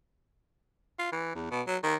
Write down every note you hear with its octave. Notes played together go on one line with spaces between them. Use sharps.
F4
E3
E2
B2
F#3
D#3